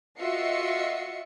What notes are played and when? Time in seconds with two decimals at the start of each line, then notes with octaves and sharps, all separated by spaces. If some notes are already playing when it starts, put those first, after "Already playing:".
0.20 F4 F#4 D#5 E5 C7 C#7